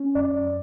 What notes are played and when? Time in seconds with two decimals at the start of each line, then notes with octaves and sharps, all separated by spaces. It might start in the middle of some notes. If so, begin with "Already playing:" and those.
Already playing: C#4
0.15 F#2 D5